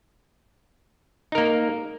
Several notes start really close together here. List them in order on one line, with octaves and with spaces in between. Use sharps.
D#4 A#4 A#3